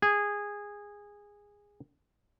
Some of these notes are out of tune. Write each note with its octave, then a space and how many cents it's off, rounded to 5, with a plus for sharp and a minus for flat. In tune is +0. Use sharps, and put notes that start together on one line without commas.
G#4 -15